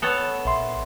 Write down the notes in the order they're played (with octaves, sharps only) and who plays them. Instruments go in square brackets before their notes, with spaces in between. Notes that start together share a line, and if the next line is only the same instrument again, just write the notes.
[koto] B3 A4 C#5
[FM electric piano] A#1 E5 C6